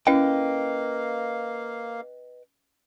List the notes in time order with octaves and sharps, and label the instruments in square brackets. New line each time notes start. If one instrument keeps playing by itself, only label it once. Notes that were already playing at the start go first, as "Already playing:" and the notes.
[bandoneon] A#3 F5 [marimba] C#4 E4 [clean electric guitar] B4 D#5 G5